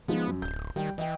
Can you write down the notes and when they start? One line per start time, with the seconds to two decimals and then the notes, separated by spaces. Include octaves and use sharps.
0.08 F3 G#3 B3 D#4
0.27 F#2
0.42 D1 G6
0.76 D#3 G3 G5
0.98 E3 D#5 G5